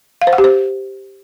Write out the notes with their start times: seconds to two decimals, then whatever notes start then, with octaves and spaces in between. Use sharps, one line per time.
0.22 F5
0.27 C5
0.33 F#5
0.38 G4
0.44 C5